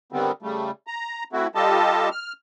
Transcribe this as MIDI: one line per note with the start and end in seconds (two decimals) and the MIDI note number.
0.12 0.32 50
0.12 0.32 51
0.12 0.32 55
0.12 0.32 59
0.12 0.32 60
0.42 0.71 49
0.42 0.71 55
0.42 0.71 57
0.87 1.24 82
1.33 1.47 57
1.33 1.47 60
1.33 1.47 64
1.33 1.47 66
1.55 2.09 55
1.55 2.09 65
1.55 2.09 67
1.55 2.09 69
1.55 2.09 75
1.55 2.09 81
2.11 2.33 89